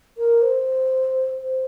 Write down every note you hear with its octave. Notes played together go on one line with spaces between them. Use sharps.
A#4
C5
C5